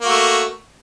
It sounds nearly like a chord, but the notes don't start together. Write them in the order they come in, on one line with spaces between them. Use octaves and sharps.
A#3 F#4 A3